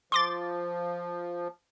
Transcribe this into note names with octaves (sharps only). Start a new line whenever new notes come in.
F3 C6 D6 A6